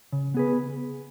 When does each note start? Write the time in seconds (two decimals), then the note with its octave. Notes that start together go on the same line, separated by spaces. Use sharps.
0.13 C#3
0.34 B3 G#4 B4